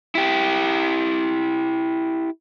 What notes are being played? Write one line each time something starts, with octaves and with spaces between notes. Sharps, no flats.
E4 G4